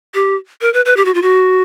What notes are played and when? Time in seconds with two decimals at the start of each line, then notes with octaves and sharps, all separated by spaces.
0.14 G4
0.61 A#4
0.74 B4
0.85 B4
0.97 G4
1.05 F#4
1.14 F4
1.22 F#4